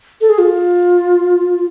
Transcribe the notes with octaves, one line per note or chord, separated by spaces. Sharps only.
A4
G#4
F4